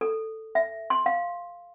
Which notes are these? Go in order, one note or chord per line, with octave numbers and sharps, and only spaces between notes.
A4
E5
C6
F5